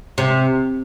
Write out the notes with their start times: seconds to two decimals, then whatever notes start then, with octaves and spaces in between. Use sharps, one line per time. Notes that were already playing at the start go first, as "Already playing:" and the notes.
0.18 C3